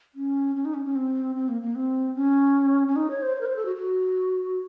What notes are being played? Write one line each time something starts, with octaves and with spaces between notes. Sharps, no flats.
C#4
C#4
D#4
C#4
C#4
C4
C4
A#3
A#3
C4
C#4
C#4
D#4
C#5
C5
C#5
A#4
C5
A4
F#4
F#4